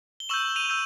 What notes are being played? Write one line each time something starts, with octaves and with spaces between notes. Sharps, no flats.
G7
C#6 E6 G6 E7 F#7
D#7 F7
E6 G6